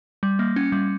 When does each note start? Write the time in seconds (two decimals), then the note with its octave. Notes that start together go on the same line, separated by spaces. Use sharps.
0.23 G3
0.39 A#3
0.56 C#4
0.72 G3